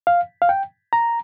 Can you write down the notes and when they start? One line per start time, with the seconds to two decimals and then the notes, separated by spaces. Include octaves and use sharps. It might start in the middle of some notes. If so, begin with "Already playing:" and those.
0.07 F5
0.42 F5
0.49 G5
0.93 A#5